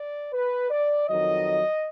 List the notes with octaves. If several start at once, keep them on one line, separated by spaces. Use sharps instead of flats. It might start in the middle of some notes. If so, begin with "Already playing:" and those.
Already playing: D5
B4
D5
F2 D#3 F#3 D#5